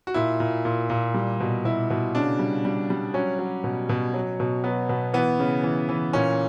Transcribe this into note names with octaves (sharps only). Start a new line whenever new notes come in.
F#4
A#2 E4
A#2
A#2
A#2
G3
B2
B2 E4
B2
C#3 D4
G3
G3
G3
F#3 C#4
F#3
B2
B2
F#3
B2
F#3 B3
B2
E3 B3
C#3
E3
E3
A#2 C#4